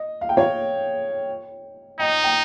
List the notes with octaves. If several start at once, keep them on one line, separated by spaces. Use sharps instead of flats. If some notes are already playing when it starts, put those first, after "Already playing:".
Already playing: D#5
F5
G5
C#5 F5
D#4 D#5 G5
G5